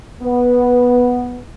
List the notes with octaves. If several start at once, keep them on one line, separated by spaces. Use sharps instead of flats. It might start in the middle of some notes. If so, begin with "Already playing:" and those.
B3